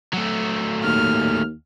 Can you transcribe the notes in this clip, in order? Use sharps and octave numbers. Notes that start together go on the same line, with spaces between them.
F#3 A3
D#2 F6